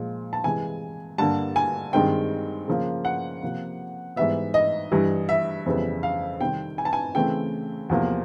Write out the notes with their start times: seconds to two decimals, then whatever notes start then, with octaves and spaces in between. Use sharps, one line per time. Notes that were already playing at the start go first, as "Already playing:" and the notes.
Already playing: A#2 F3 G#3
0.33 A5
0.44 C3 E3 G#3 G#5
1.18 G2 D3 G3 A#3 A5
1.56 G#5
1.93 G2 D#3 G#3 C4 G5
2.68 C#3 F3 A#3
3.05 F#5
3.42 C3 F3 A#3
4.16 G#2 E3 G3 B3 E5
4.54 D#5
4.91 G2 E3 G3
5.29 E5
5.66 F2 C#3 E3 G3 B3
6.03 F5
6.40 C3 D#3 G3 C4 G5
6.78 G#5
6.85 A5
6.93 G#5
7.15 C#3 E3 A3 C4 G5
7.89 E2 C3 F3 A#3